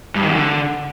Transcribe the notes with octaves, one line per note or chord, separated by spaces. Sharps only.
G2
D#3
E2
D3